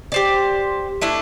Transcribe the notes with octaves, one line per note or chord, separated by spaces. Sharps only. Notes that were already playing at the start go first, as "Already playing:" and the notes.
G4 C5 D5
A3 D4 E4